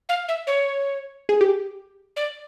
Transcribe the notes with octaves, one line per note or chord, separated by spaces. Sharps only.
F5
E5
C#5
G#4
G4
D5